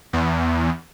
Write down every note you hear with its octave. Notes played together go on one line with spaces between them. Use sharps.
E2